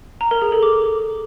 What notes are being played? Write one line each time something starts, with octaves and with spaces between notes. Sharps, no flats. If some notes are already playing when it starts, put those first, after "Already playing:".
A#5
A#4
G#4
A4
D6